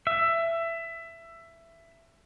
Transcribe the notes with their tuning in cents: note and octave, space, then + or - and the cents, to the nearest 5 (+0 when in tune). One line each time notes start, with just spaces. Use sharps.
E5 +15